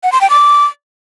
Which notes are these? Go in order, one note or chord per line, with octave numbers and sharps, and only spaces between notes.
F#5
C6
G5
D6